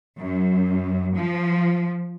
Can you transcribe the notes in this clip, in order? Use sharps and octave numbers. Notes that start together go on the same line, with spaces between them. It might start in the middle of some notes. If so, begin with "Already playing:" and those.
F#2
F3